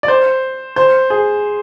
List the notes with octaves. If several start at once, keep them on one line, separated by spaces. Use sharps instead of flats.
D5
C5
C5
G#4